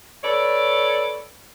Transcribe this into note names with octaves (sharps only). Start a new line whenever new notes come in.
A4 B4 C#5 D5